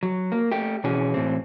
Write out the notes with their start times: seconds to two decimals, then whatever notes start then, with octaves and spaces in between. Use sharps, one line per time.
0.03 F#3
0.32 A#3
0.52 A3 G4
0.84 B2 E3 C#4 F#4 G#4
1.14 A2 E3 C4